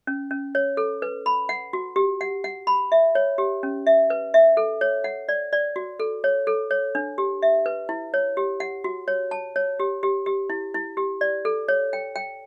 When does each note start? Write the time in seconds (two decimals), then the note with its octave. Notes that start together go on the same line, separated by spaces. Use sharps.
0.07 C#4
0.31 C#4
0.55 C#5
0.77 A4
1.02 B4
1.26 B5
1.49 F#5
1.73 F#4
1.96 G4
2.21 F#5
2.44 F#5
2.67 B5
2.92 E5
3.15 C#5
3.38 G4
3.63 C#4
3.87 E5
4.10 B4
4.34 E5
4.57 A4
4.81 C#5
5.04 F#5
5.29 D5
5.53 D5
5.76 F#4
6.00 A4
6.24 C#5
6.47 A4
6.71 C#5
6.95 D4
7.18 G4
7.42 E5
7.66 B4
7.89 E4
8.14 C#5
8.37 G4
8.60 F#5
8.84 F#4
9.08 C#5
9.31 A5
9.56 C#5
9.80 G4
10.03 G4
10.26 G4
10.50 E4
10.74 E4
10.97 G4
11.21 D5
11.45 A4
11.68 C#5
11.93 G5
12.16 G5